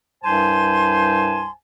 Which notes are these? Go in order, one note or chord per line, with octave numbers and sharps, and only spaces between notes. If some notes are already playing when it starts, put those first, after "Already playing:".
C2 G2 C5 G#5 A5 C6